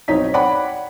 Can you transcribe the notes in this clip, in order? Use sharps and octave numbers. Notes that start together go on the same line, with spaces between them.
B1 C4 D#4 C#5 D#5 B6
C#5 D5 F#5 G5 B5